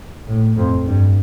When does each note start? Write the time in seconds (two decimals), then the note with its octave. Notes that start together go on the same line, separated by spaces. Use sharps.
0.27 A2
0.57 F2
0.86 G2